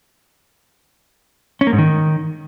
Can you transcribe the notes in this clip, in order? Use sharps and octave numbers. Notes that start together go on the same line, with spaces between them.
C#4
A#3
G#2
D#3